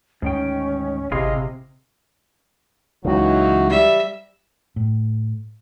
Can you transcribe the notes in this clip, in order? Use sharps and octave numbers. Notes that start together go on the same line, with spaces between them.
D2 G#2 D#3 C#4 G5
G#1 C3 E4 F4 G#4 D#5
C#2 C#3 E3 F#3 D#4 F#4
G3 E5
A2